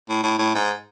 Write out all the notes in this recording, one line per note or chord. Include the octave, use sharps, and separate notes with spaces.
A2
A2
A2
G#2